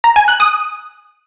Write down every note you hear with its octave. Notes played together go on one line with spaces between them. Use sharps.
A#5
G#5
F#6
D#6